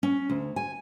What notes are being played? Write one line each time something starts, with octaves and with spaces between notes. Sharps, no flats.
C#4
D2
G#5